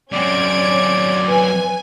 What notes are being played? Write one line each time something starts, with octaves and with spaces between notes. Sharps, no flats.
F#2 C4 C#4 D5 G#6 D7
B4 G#5